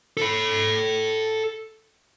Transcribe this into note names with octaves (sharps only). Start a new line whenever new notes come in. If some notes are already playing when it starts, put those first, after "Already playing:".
A4 B5